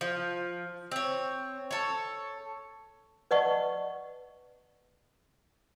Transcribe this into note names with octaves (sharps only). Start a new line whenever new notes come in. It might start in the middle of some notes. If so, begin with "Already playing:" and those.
F3
C4 C#5
A4 C#5
B4 D5 D#5 F#5 A5 C#6